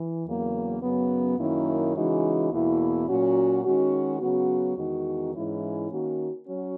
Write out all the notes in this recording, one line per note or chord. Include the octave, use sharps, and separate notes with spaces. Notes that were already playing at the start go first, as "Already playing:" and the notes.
Already playing: E3
E2 C#3 F#3 A#3
F#2 C#3 F#3 B3
F#2 D#3 A#3 C#4 E4
C#3 E3 G#3 D#4 F#4
E2 B2 A#3 E4
A#2 F#3 C#4 F#4
D#3 G#3 C#4 F#4
C#3 F#3 B3 F#4
E2 D#3 G#3 D#4 F#4
G#2 E3 G#3 C#4 E4
D#3 A#3 C#4 F#4
F#3 C#4 F#4